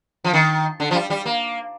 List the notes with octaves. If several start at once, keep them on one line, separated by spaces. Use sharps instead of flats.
F3
D#3
D3
F3
G3
G3
A#3